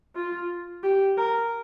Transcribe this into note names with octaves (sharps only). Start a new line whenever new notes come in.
F4
G4
A#4